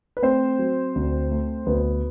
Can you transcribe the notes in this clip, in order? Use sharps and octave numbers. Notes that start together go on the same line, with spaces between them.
B4
A3 C4 C5
F#3
D2
A3
D2 B3 B4